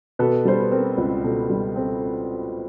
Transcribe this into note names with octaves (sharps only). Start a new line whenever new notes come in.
B2 A4 B4
G3 C5
B4
C4 A#4
C#2
B2 A4
G3
C4 A4